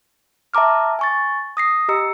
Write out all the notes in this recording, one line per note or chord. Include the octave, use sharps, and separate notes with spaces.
E5 A5 A#5 D6 F6
G#5 C#6 A6
D#6 A#6 C7
G4 D#5 A#5 E6 C#7